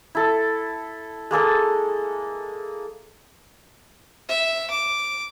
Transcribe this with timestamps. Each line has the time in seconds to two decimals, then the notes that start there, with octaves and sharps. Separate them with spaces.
0.15 E4 A4
1.31 G#3 A#3 A4 A5
4.29 E5
4.70 D6